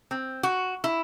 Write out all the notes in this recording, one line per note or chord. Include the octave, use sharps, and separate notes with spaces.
C4
F#4
E4